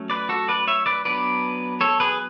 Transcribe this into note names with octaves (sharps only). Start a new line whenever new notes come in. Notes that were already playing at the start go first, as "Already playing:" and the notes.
Already playing: F#3 A3 C#4
B4 D5
F#4 A4
B4 D5
C#5 E5
B4 D5
F#3 B3 D4 B4 D5
A4 C#5
G#4 B4